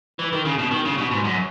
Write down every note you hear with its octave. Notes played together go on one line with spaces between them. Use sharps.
E3
D#3
C#3
B2
D#3
C#3
B2
G#2
F#2